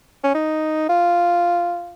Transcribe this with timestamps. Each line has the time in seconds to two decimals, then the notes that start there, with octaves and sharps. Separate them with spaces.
0.24 C#4
0.35 D#4
0.89 F4